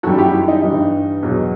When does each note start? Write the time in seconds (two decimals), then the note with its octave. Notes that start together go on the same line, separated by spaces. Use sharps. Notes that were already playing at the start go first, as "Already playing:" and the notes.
0.03 F#2 D#3 G3 F#4 A4
0.18 E4 G4
0.33 E4
0.48 D#4
0.63 G2 E3 G3
1.22 E2 B2 F#3